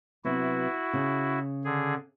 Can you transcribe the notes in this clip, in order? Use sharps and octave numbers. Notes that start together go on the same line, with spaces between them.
C3 F#3 B3 E4 F#4
C#3
D3 G#4